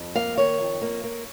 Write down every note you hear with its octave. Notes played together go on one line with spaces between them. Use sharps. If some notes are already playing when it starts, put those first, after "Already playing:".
Already playing: F2
A#3 F5
D#3 C#5
F2
A#3
A#3